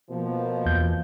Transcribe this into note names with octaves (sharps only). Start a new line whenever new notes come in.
B2 F3 A#3
E2 G6